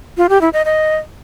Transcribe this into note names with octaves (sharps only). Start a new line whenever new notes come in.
F4
G4
E4
D#5
D#5